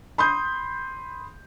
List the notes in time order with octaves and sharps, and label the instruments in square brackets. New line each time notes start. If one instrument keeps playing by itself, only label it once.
[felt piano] B5 C6 D#6 G6